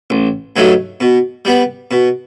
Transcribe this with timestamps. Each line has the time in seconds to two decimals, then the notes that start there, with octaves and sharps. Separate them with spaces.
0.10 A1
0.56 G2 D#3 F#3 A3
1.00 B2
1.45 G3 B3
1.91 B2